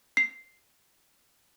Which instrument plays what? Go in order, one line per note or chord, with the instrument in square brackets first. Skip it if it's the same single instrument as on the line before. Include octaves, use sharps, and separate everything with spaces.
[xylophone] C7